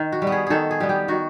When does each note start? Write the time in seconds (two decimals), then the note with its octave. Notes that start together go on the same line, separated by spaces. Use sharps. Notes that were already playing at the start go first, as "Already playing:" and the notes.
Already playing: D#3
0.12 F#4
0.22 G3
0.27 B3
0.32 G#4
0.47 D#3 G#4 A4
0.71 G#4
0.80 G3 B3
0.89 G4
1.08 D#3 F#4